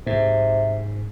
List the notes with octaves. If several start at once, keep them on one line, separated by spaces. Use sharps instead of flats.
G#2 C3